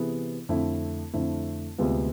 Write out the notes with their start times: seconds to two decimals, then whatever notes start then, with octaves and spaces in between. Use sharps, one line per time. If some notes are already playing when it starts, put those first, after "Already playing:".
Already playing: C3 E3 B3 E4 G#4
0.49 F2 D3 A3 E4
1.13 F2 D3 A3 E4
1.78 D2 C3 G#3 B3 F4